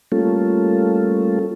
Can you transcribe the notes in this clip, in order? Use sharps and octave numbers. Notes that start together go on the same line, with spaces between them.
G3 A3 A#3 C#4 F4 A4